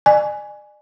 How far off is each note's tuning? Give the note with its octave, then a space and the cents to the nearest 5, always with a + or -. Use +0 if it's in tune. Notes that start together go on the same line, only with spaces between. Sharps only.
D5 +45 G#5 +0